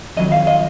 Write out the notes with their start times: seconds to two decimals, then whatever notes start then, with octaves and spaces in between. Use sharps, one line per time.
0.17 F2 D#3 F#3 D#5
0.32 F5
0.47 D#5